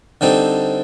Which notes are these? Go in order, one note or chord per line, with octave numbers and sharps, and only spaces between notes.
D3 G3 C4 D#4 A4